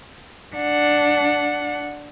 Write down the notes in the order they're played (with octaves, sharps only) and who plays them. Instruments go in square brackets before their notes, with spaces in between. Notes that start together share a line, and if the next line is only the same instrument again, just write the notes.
[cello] D4 F#5